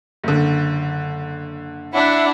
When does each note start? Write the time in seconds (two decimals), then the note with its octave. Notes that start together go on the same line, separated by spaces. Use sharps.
0.24 F#1 D3
1.94 D4 E4 E5 F#5